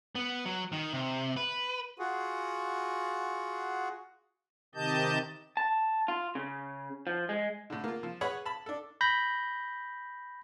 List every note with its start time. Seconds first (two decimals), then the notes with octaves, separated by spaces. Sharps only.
0.15 B3
0.46 F#3
0.72 D#3
0.93 C3
1.37 B4
1.99 F4 F#4 G#4 F#5
4.75 C3 D#3 G4 D#5 A5 G6
5.57 A5
6.08 F4
6.35 C#3
7.07 F3
7.29 G#3
7.70 A2 D3
7.84 A#3 F4
8.03 F3
8.21 G#4 B4 C#5 F#5 B5
8.46 A5 B5
8.66 D4 A4
9.01 B5 G6 A#6